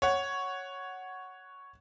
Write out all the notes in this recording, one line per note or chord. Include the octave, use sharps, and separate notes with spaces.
C#5 F#5